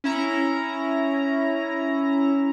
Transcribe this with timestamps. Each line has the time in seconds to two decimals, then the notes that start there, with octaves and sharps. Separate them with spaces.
0.04 C#4 E4 A#5